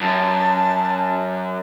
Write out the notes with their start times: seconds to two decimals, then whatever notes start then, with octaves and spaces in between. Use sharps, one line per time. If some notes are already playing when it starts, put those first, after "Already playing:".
0.01 F#2 A5